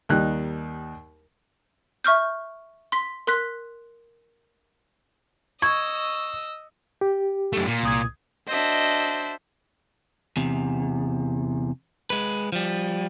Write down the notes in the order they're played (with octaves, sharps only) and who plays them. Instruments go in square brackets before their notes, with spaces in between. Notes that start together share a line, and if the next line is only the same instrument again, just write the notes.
[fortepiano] D#2 G3 D#4 F#6
[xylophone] E5 C#6 F6 G6
C6 B6
A#4 C6 F#6 B6
[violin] D#5 E6 [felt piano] C#6 [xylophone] G#6
[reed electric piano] G4
[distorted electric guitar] F#2 A3
A#2
[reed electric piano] C2 D#6 G#6
[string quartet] D4 F#4 [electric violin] C5 E5 [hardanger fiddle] D#5
[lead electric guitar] E2 C3
G#3 B4
F3 G3